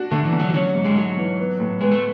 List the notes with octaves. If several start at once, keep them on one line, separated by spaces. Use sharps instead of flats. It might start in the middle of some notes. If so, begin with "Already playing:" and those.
Already playing: D4 F#4
D3 A3
E3
D3
F#3
E3
F#3 C#4
G#2
G#3
F#3 A3
E3
B3
A2
G#3 B3
A3